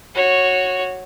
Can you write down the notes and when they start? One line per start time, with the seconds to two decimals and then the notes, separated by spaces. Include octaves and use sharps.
0.15 F#4 C#5